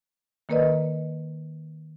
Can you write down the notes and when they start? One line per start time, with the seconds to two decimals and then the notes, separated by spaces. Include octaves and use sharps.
0.49 D#3 A#3 A#4 B4 D5 D#5